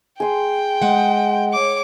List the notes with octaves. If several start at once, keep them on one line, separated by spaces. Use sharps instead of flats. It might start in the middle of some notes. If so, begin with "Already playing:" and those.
G#4 G5 C6
G#3 F#5
C#5 D6